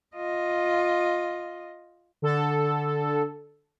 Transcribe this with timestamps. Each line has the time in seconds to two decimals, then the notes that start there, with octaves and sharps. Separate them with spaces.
0.16 F4 D#5
2.22 D3 A4